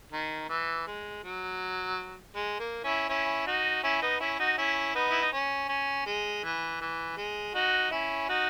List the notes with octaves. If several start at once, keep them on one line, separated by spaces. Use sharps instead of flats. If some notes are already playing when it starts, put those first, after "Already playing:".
D#3
E3
G#3
F#3
G#3
A#3
C#4 E4
C#4 E4
D#4 F#4
C#4 E4
B3 D#4
C#4 E4
D#4 F#4
C#4 E4
B3 D#4
E4
D#4
C#4
C#4
G#3
E3
E3
G#3
D#4 F#4
C#4 E4
D#4 F#4